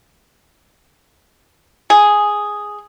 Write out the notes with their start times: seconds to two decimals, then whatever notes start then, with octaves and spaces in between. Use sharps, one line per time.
1.90 G#4